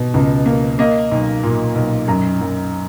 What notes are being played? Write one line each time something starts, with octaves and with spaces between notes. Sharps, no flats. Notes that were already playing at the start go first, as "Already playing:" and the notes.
Already playing: B2
C#2
A#3
A#3 D#5
B1
A#2
B1
F#2 A#5
F#2